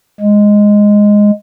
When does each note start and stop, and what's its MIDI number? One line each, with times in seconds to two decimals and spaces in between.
0.20 1.31 56